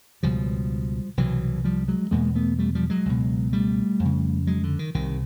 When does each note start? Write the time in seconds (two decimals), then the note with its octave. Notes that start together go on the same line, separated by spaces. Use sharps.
0.23 C#2 B2 F3 G3
1.17 C2 B2 E3 F#3
1.64 F3 G3
1.88 F#3 G#3
2.11 E2 B2 G#3 A#3
2.35 A3 B3
2.59 G3 A3
2.75 F3 G3
2.90 F#3 G#3
3.05 C#2 B2
3.53 G3 A3
4.00 F2
4.05 C#3
4.47 F#3 G#3
4.64 D3
4.79 D#3
4.94 C2 C3 D#3